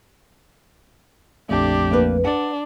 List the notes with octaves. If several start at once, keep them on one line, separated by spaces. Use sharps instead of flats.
A#1 F2 A3 D4 G4
A#3 A#4 B4
D4 D5 F#5